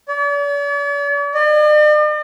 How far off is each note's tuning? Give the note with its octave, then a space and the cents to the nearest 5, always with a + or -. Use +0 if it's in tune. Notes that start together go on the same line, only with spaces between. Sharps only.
D5 -45
D5 +45